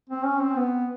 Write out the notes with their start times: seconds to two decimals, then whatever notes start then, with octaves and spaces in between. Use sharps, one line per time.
0.09 C4
0.25 C#4
0.41 C4
0.56 B3